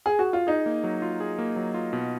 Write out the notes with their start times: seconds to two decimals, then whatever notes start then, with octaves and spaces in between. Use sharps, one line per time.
0.06 G#4
0.19 F#4
0.33 F4
0.47 D#4 G#4
0.66 A#3
0.84 F#3
1.02 F4
1.20 G#4
1.39 A#3
1.56 F#3
1.74 F4
1.93 B2